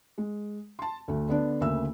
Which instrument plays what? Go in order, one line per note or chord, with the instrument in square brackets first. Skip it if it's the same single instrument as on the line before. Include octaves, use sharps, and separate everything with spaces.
[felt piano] G#3
A5 C6
D2 A3
D3 B3 D4
D2 C#3 A#3 E5 E6